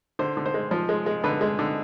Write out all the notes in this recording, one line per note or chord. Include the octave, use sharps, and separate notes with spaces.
D3 C5
D3
C5
G#3
F3
G#3
G#3
D3 B4
G#3
D3